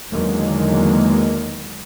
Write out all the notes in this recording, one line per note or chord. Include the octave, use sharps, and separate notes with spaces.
E2 D3 D#3 F#3 G#3 A#3